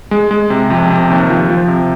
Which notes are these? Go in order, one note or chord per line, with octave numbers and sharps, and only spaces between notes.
G#3
G#3
C3
F2
C3
D#2
F3
F3
C3